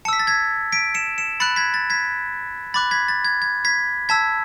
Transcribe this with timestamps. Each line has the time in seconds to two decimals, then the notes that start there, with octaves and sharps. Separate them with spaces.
0.05 A5 C#7
0.08 E6 B6
0.19 A6
0.27 G#6 B6
0.72 B6 D7
0.94 C#7 E7
1.18 C#7 E7
1.40 B5 F#6 A6 C#7
1.56 G#6 B6
1.74 A6
1.90 G#6 B6
2.74 B5 D6 F#6 A6
2.91 G#6 B6
3.08 A6
3.25 G#6
3.42 G#6
3.65 G#6 B6
4.09 A5 E6 G#6 B6